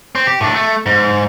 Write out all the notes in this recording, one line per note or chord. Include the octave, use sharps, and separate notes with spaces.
C4
G4
A2 D4
A3
G#2